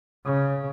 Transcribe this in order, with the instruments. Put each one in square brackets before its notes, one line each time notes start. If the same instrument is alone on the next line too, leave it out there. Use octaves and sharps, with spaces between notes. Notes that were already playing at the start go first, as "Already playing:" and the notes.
[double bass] C#3